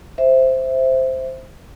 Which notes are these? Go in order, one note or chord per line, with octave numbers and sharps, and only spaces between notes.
C5 E5